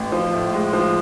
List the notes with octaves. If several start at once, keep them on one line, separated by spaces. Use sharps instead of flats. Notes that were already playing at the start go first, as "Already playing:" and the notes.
Already playing: A1
F3
A2
G#3
F3